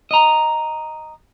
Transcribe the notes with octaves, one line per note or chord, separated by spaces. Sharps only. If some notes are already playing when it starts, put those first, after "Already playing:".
D#5 A#5